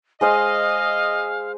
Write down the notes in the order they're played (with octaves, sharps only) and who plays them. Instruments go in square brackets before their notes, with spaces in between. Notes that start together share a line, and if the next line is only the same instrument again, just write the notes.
[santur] G#3 C5 D#6 [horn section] D#5 [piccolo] F5